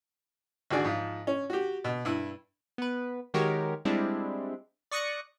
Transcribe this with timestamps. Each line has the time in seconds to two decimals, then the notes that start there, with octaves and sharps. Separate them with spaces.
0.71 G#1 D3 F#4 G#4 D5
0.85 G#2 F3 F4
1.27 C#4
1.50 F#4 G4
1.84 B2
2.05 G2 E4
2.78 B3 B4
3.34 D#3 G#3 F#4 G4 A#4 C#5
3.85 G3 G#3 C4 D4 E4
4.91 D5 C#6 D#6 F#6 A#6 C#7